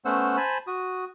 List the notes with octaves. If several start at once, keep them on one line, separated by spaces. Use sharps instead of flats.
A3 B3 C#4 C5 F#5 E6
C5 G#5 A5 B5
F#4 D#6